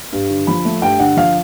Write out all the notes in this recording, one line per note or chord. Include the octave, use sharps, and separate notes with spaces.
G2
D3
F3 B5
A3
G2 G5
D3 F#5
F3 F5